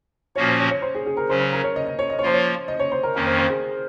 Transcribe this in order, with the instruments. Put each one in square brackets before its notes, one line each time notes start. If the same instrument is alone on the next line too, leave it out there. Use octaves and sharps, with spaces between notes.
[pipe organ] A#2 F3 A#3 C#4 F#4 [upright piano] C#5
[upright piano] C5
C#5
C#5
C5
G#4
G#4
A#4
[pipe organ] C#3 F#3 C#4 [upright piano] C5
[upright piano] C5
A#4
C#5
D#5
D#5
C#5
D#5
C#5
[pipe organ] F3 A#3 F4 [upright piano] C5
[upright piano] C#5
D#5
C#5
C5
A#4
[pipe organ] F2 D#3 A#3 C#4 [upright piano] A#4
[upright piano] C5
C5
G#4